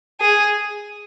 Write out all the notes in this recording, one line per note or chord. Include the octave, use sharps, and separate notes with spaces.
G#4